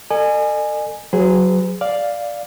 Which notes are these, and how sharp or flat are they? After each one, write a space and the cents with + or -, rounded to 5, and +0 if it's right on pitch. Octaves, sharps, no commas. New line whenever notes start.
A4 +45 D#5 -45 G#5 +0
F#3 +0 G#4 -10 B4 +45
D5 +0 F5 +0